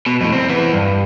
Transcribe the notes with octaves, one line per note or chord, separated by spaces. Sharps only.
B2
F2 A2
C2 C4
E3 B3
G2